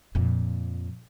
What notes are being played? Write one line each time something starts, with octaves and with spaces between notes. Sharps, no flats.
F2 A#2